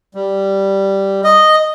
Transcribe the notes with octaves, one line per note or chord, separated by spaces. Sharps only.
G3
D#5